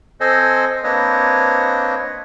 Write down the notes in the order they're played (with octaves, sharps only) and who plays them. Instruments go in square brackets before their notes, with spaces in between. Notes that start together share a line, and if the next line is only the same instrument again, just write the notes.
[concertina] C4 A4 C5 D#5 G#5
A#3 C4 D4 B4 C#5 D#5